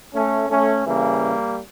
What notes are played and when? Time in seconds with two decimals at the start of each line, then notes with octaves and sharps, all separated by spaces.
0.13 A3 C#4
0.48 A3 C#4
0.85 C#3 E3 G3 A#3